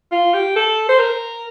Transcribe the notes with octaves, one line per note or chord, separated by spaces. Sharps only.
F4
G4
A4
C5
A#4